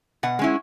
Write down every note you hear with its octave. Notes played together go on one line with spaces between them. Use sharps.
B2 F#5
G#3 C#4 E4